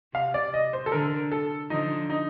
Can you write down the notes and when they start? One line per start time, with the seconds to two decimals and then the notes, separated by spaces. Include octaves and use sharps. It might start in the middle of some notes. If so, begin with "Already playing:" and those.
0.14 C3 F5
0.34 D5
0.54 D#5
0.73 C5
0.86 A4
0.92 D3 A#4
1.32 A4
1.70 D3 F3 D#4
2.10 D#4